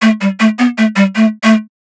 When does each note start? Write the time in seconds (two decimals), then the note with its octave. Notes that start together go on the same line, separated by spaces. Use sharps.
0.02 A3
0.21 G3
0.40 A3
0.59 B3
0.78 A3
0.96 G3
1.16 A3
1.44 A3